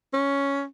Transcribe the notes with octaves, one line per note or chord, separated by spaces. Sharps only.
C#4